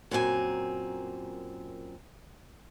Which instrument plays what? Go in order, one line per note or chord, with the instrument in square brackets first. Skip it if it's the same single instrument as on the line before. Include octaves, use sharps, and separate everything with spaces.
[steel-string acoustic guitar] F#2 A#2 C4 F4 G#5